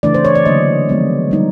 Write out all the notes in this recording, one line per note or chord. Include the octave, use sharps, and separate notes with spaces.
C#3 E3 A3 D4 D5
C5
C#5
D5
D3 F#3 A#3 D#5
F3 G#3 B3
G3 A#3 D#4